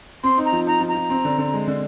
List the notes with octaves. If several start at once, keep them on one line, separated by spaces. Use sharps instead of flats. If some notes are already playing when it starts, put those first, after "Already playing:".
C4 C6
D#4
A#5
F3
D#4 A#5
F3
A#5
F3
C4
D3
D3
G#3
D3